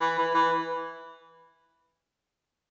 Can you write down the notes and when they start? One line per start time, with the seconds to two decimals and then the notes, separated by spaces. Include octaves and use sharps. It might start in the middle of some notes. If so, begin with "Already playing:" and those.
0.01 E3
0.18 E3
0.34 E3